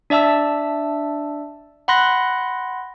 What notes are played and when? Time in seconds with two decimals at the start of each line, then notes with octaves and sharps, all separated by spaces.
0.10 D4 D5 E5 A5 E6
1.88 F#5 B5 C6 F#6 A#6